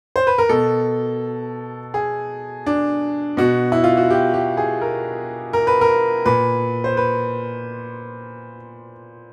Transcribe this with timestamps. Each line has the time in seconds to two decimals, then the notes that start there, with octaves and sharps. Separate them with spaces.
0.16 C5
0.27 B4
0.38 A#4
0.49 B2 A4
1.94 G#4
2.66 D4
3.37 B2 F#4
3.72 E4
3.84 F4
3.97 F#4
4.10 G4
4.34 G4
4.57 G#4
4.81 A#4
5.53 A#4
5.67 B4
5.81 A#4
6.26 A#2 B4
6.84 C5
6.97 B4